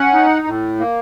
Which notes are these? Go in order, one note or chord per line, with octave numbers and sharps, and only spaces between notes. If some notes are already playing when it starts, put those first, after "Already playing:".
Already playing: C#4 F#5
D#4
A2
A#3